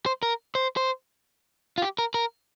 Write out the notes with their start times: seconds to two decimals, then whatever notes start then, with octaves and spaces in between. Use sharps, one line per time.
0.06 C5
0.23 A#4
0.55 C5
0.77 C5
1.78 F4
1.82 G4
1.98 A#4
2.14 A#4